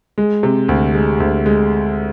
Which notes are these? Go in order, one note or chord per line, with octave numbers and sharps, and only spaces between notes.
G#3
C3
D2
G#3
D2
G#3